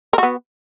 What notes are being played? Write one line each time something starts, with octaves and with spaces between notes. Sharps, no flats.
B3 F#4 A#4